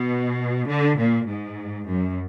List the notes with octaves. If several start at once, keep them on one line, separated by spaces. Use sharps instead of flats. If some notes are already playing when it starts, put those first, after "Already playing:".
Already playing: B2
D3
A#2
G#2
F#2